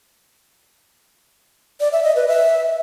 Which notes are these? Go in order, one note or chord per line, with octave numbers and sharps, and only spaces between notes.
D5
E5
D#5
B4
E5